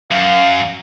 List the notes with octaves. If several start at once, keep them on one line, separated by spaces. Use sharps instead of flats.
F#2 F5